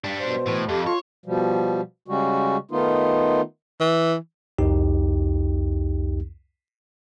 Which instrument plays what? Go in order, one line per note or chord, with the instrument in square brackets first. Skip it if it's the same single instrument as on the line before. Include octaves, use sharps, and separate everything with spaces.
[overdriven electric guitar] G3 D4
[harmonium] B2 C5
[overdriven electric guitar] A2 [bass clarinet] E3
[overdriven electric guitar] F2 [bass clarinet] G4 [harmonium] A4 D#5 F5
[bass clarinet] F4 [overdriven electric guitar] C#5
[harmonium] B2 F3 G3
C#3 G3 G#3 F#4
D#3 A3 B3 D#4 F4
[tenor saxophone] E3
[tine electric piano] C2 F2 D#4 G4